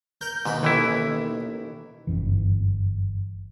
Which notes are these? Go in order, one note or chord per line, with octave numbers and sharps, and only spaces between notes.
A#4 G6
D#2 G#2 B2 B4
A1 D#3 E3 E4
G1 C#2 F#2 E3